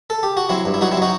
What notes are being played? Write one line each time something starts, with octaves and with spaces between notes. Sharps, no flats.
A4
G4
F#4
F#3 C4 E4
G2
E4
F#3 D#4 F#4
C4 E4
F#3 D#4 F#4